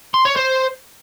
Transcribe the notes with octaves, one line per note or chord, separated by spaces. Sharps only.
C6
C#5
C5